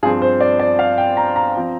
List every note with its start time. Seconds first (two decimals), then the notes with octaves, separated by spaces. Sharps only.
0.03 G2 F3 C4 G#4
0.22 C5
0.41 D5
0.60 D5
0.79 F5
0.98 G5
1.17 A#5
1.36 A#5
1.57 F3 C4